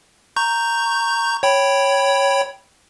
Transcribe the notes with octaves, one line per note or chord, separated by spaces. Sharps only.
A#5 C#6 G6
C#5 G5 B5